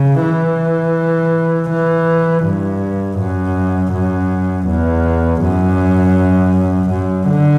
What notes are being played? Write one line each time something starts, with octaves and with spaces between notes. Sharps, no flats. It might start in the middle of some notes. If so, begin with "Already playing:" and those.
Already playing: C#3
E3
E3
G2
F#2
F#2
E2
F#2
F#2
D3